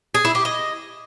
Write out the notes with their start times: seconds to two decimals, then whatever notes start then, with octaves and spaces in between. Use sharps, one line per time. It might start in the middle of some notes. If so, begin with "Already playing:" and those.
0.14 G#4
0.25 E4
0.35 G4
0.45 D#5